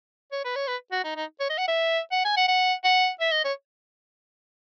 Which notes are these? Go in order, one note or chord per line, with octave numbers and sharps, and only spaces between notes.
C#5
B4
C#5
B4
F#4
D#4
D#4
C#5
D#5
F#5
E5
F#5
G#5
F#5
F#5
F#5
E5
D#5
C#5